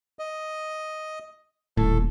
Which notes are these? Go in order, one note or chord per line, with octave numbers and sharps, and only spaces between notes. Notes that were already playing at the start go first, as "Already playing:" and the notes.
D#5
D#1 A2 A4